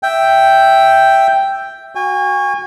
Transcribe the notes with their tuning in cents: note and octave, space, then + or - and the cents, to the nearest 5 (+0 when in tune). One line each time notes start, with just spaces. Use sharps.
E5 +0 G5 +0
F#4 +0 G#5 -35